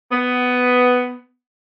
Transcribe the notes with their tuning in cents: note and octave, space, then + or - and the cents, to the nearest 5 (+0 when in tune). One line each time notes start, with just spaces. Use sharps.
B3 +10